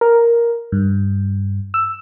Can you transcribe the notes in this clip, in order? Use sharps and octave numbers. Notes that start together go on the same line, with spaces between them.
A#4
G2
E6